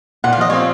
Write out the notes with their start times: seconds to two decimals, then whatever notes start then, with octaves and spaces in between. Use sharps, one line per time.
0.24 A#2 F#5
0.33 F5
0.38 F3 D#5
0.50 C4 C#5 F5